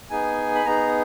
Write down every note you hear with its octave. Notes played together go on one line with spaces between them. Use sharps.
B3 D#4 G#4 G#5
B5
B3 D#4 G#4 A#5